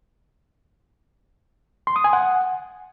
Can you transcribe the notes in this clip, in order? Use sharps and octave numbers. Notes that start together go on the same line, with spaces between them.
C6
D#6
G#5
F#5